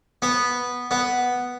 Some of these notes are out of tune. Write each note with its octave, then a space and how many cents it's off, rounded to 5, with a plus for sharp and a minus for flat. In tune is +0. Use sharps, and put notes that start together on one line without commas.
B3 -5
B3 +0